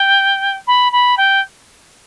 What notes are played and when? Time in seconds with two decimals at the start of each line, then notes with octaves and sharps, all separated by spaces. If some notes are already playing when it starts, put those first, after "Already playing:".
Already playing: G5
0.67 B5
0.92 B5
1.18 G5